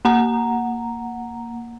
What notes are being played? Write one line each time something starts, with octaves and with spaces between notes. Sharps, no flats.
A#3 F#5 A#5